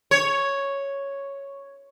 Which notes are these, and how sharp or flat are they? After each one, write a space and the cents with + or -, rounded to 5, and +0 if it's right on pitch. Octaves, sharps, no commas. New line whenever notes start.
C#5 +0